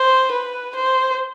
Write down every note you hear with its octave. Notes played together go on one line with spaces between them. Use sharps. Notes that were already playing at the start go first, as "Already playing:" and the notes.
Already playing: C5
B4
C5